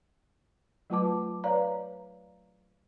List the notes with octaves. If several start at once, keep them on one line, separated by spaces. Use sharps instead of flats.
F#3 A3 F4 B4 A5 D6
B4 C#5 D5 F5 A#5